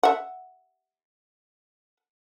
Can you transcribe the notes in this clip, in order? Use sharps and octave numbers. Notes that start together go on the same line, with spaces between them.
E5 F#5